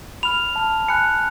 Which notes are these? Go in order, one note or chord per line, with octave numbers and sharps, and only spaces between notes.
B5 F6 F7
A5 F6
G#5 B5 F#6 C#7